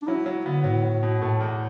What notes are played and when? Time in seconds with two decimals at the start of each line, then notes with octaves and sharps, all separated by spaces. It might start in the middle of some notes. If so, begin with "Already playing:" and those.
0.02 D4
0.07 F#3 E4
0.26 F#3
0.45 D3 B3
0.64 A2 F#3
0.84 F#3
1.03 B2
1.22 A2 A3
1.40 E2